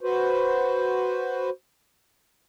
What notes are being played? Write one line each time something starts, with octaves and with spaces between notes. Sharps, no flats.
F#4 B4 C5